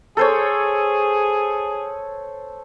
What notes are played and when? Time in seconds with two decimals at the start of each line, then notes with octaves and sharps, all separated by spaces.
0.17 G#4 A4 C5 C#5